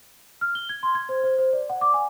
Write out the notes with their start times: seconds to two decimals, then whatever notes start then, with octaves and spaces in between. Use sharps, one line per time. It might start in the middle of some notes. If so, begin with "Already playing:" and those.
0.41 F6
0.55 G7
0.69 G#6
0.83 C6
0.95 G#6
1.09 C5
1.24 C5
1.38 C5
1.53 D5
1.70 F#5
1.81 D6
1.94 G#5